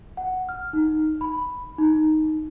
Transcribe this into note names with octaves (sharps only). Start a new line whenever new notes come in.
F#5
F6
D#4
B5
D#4